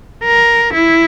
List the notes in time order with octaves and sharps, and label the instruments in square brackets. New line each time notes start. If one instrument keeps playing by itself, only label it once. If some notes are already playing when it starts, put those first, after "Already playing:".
[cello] A#4
E4